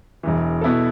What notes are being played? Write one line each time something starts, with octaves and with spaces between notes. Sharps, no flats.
E1 E2 E3
B2 B3 E4 A4